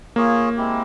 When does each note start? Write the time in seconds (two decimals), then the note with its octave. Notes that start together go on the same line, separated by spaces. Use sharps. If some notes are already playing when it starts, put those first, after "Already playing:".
0.16 A#3 F4 G#4 C#5
0.57 G#3 C4 E4 G4